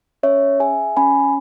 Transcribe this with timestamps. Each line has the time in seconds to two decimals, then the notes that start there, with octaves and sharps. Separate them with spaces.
0.23 C#4 C#5 E5
0.60 G#4 E5 G#5
0.97 C#4 G#5 B5